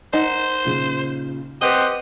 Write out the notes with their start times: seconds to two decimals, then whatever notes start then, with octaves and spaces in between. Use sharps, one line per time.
0.13 D#4 C5 F#5
0.65 A#2 C#3
1.62 C4 G4 B4 D#5 F#5